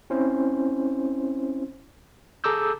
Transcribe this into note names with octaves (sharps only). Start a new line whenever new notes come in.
C4 C#4 E4 C5
G#4 A4 A#5 D6 E6 G6